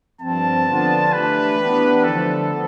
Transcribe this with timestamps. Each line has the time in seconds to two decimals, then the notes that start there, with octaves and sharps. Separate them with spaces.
0.21 G2 F3 C4 A5
0.67 D3 F3 B3 D4 F4
1.12 E3 A3 D4 G4 B4
1.59 E3 B3 D4 G4
2.04 D3 F3 A3 A4
2.50 F3 B3